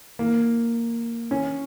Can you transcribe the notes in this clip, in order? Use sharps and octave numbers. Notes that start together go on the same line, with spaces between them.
A#3
C#4